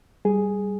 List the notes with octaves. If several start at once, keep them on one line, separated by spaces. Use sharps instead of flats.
G3 G#4